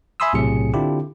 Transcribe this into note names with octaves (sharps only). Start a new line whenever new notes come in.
E5 G#5 B5 C6 D#6 E6
B1 A2 C3 F#3 G#4 C#7
D3 C4 D4 E4 F4 G4